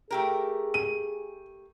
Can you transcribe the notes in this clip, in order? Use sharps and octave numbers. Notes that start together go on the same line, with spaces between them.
A3 G4 G#4 A#4
D#7